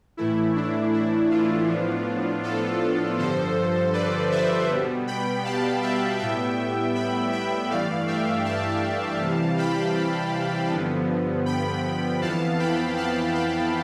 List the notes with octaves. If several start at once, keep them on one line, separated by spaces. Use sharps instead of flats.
A2 E3 A3 E4
D4
E4
D4 F4
A2 F3 B3
F4 A4
G2 D3 F3 A4 C5
B4 D5
C5 E5
B2 G3 B3
G5 B5
F5 A5
E5 G5
A2 G3 B3 E5 G5
G5 B5
E5 G5
G2 E3 A3 D5 F5
E5 G5
F5 A5
C3 E3 G3
G5 B5
G2 D3 F3 B3
G5 B5
F2 E3 B3 F5 A5
G5 B5
F5 A5
G5 B5